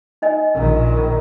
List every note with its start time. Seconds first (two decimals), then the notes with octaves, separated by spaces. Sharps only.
0.22 D#4 D#5 G#5
0.54 A#1 D#3